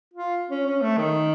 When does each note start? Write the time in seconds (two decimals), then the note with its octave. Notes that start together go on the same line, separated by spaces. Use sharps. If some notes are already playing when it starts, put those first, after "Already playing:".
0.14 F4
0.50 C#4
0.66 C#4
0.82 A3
0.97 D#3